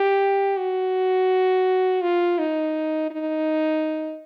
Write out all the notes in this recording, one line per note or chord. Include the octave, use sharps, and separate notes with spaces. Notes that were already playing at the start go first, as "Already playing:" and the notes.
Already playing: G4
F#4
F4
D#4
D#4